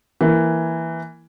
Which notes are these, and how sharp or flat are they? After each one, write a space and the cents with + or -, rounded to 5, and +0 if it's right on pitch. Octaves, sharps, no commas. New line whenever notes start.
E3 +0 A#3 +0